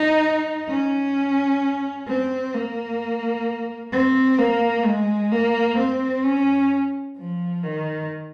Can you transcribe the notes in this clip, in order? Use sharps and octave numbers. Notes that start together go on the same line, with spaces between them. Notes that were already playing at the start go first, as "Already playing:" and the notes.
Already playing: D#4
C#4
C4
A#3
C4
A#3
G#3
A#3
C4
C#4
F3
D#3